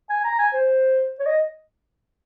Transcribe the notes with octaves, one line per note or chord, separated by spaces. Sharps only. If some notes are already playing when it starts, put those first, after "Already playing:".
G#5
A#5
G#5
C5
C#5
D#5